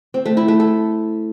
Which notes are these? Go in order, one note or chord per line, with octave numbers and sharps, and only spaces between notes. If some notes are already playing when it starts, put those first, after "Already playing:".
C4
A3
E4
A3
A4